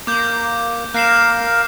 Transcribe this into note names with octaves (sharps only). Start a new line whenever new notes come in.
A#3 D6 G6
A#3 A#4 F5 F#6 C7 E7